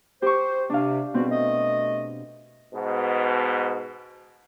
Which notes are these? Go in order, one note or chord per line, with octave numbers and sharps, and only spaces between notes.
G4 C5 C#6
C3 D4 F5
G#2 B2 G3 C4 F#4
A3 D#5
G#2 B2